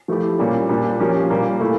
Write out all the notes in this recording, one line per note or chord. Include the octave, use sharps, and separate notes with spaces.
F3 A3 E4 G4
A#2 G3 A#3 C#4
A#2 G3 D4 G4
F3 A#3 C#4 G4
A#2 G3 A#3
A#2 A3 E4